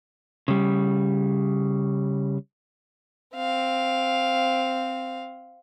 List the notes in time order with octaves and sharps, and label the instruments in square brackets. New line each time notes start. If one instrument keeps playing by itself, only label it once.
[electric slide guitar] C#3 G3
[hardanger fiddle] C4 F5